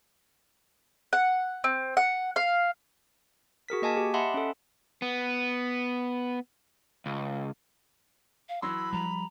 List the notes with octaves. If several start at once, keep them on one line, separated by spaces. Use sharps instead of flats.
F#5
C4
F#5
F5
F#4 G#4 A#4 B6
A#3 D#5 G#5 A5 B6
G4
D#5 E5 F#5 A5 B5 C6
C#4 A4
B3
C#2
F5
E3 F#3 B5 C6 E6
F3 G3 A#5